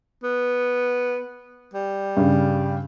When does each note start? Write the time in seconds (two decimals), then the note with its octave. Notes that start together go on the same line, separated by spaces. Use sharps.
0.24 B3
1.74 G3
2.17 G2 C#3